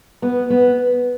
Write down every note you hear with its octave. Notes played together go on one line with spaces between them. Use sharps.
B3
B3